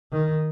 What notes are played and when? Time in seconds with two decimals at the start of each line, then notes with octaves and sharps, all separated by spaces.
0.12 D#3